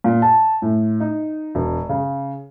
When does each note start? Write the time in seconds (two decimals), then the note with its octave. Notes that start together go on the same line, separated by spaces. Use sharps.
0.04 A#2
0.22 A5
0.62 A2
1.00 D#4
1.55 E1
1.89 C#3